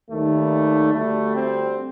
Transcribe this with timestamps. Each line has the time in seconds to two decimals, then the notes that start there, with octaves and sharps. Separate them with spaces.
0.09 D#2 D#3 G3 A3
0.93 D2 D3 G3 A3
1.35 C4